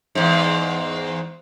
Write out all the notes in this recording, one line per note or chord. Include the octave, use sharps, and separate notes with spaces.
E2 G#2